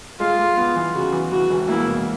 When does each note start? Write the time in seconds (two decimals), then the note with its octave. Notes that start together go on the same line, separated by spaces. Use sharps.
0.20 G#3 F4
0.39 G#3
0.57 B3
0.76 E3
0.94 C#3 F#4
1.12 E3
1.32 E3 F#4
1.50 E1
1.69 A#3 E4
1.87 B2